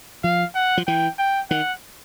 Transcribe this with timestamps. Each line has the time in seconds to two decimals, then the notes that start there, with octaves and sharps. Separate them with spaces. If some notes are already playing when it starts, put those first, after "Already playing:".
0.24 F3 F5
0.55 F#5
0.77 F3
0.87 E3 G5
1.19 G5
1.50 D#3 F#5